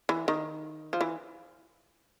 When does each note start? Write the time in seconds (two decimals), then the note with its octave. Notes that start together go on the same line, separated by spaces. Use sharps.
0.09 E3
0.28 D#3
0.93 F3
1.01 E3